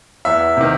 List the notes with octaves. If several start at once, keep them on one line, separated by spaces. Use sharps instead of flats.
E2 E5
C3 D#3